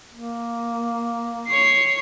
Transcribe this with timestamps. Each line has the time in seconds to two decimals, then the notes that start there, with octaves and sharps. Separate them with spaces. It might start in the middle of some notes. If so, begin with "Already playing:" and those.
0.13 A#3
1.48 C#5 C7